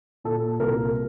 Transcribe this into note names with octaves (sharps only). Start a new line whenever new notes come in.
A#2 A4
C2 A#4